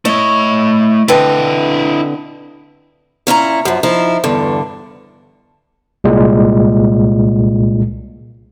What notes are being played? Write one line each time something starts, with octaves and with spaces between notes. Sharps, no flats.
A3 E4 C#5 D#5
D3 C4 E4 B4 D#5
A#2 C#4 E4 A#5
F#2 F3
F3 D#4 E4
E2 G2 D3
C2 A#2 G#3